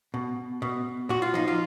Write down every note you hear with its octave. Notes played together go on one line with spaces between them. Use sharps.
B2
B2
A#2 F#4
F4
F3 D#4
F4